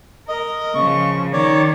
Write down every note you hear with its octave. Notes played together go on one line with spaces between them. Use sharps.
A#4 D#5
C#3 F3 C#6
D#3 C#5 D5